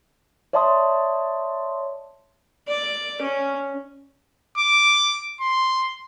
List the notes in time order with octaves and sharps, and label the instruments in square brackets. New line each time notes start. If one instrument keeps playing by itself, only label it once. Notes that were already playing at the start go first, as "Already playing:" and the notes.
[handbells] C#5 D5 E5 A5 C6 D#6
[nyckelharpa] D5
C#4
[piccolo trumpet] D6
C6